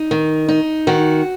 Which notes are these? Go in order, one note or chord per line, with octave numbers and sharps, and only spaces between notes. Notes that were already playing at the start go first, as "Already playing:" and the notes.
Already playing: D#4
D#3
D#4
D#3 F#4